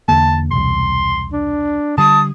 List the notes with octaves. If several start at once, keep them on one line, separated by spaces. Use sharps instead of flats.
E2 D3 A#3 A5
E1 C2 C6
D4
D3 G3 A5 D#6